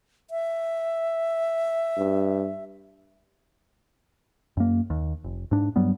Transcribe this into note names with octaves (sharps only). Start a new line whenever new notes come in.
E5
G2
F#2 A#3
D#2
F1
G#2 D4
G2 F#3 G3 B3